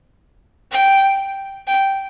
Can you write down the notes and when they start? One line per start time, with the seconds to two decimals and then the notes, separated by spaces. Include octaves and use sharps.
0.72 G5
1.68 G5